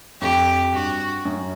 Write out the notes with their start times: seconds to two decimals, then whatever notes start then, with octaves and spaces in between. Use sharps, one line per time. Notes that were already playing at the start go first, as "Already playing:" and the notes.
0.21 F2 G4
0.73 G2 F#4
1.25 F#2